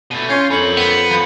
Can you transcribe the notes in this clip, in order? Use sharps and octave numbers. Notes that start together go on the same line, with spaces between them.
B2 A3 D#7
C#4 F4 C6 G6 C7
F2 A#4 C#5 B5 C#7 F#7
B3
F3 B5 C#7